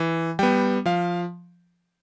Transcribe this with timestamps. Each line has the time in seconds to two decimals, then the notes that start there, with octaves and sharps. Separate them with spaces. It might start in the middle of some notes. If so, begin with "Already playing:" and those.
Already playing: E3
0.39 G3 B3 G5
0.85 F3 F5